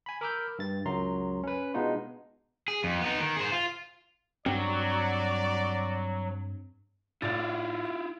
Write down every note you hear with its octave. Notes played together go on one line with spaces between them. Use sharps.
G#5 B5
A#4 B5 D6 E6 F6 G6
G2 A6
C#2 F#2 F#3 A#5 C6
C#4 B4
B2 G#3 B3 D4 D#4 F4
G#4
F2
B3 D#4
D#3
G#4 C5
F4
G2 F#3 C4 D5
A2 E4 F4 D5 A6